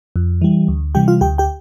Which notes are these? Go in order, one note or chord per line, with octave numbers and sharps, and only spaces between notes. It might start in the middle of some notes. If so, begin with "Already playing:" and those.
F2
E3 G3
D2
C3 E3 G3 G4 G5
F4 F5
D2 G4 G5
G4 G5